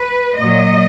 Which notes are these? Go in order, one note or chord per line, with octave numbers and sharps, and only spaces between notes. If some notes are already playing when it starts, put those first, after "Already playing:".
Already playing: B4
A#2 F#3 D#5